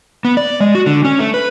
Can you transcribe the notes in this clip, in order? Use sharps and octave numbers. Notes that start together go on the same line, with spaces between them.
B3
D5
G#3
F#4
D3
C#4
A3
B4